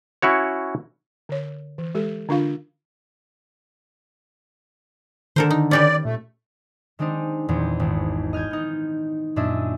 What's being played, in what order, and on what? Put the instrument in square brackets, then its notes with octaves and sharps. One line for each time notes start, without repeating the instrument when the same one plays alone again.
[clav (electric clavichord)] C#4 E4 F#4 C#5
[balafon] D3 C#5
E3
G#3 G4 A4
D3 D4 F4 F5
[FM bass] D3 [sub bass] D#3 [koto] A4 A#4 C5
[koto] D#4
[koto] C#4 G4 B4 [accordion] D5
[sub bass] A#2 [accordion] A3
[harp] D#3 G#3 C4 D4 D#4
E2 A#2 D#3 C4
G#1
D#5 F6 G6 G#6
B3 D#4
F#2 A#2 C#4 D4 D#5 E5